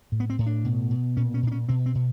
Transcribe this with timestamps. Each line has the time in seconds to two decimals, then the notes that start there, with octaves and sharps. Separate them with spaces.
0.12 A2
0.20 B3
0.30 C4
0.39 A2
0.46 D4
0.65 B2
0.90 B2
1.17 A#2 C#4
1.34 C#4
1.43 A#2 D4
1.52 C#4
1.69 B2 C4
1.86 C4
1.95 B2